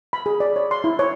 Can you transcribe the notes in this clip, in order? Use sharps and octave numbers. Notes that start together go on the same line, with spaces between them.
B5
G#4
D5
C#5
C6
E4
C#5